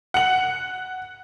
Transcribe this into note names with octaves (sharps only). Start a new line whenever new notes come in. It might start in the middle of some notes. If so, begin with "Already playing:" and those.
F#5 F#7